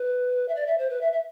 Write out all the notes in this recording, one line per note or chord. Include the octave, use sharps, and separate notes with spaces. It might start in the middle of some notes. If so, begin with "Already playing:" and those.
Already playing: B4
E5
D5
E5
C5
B4
E5
E5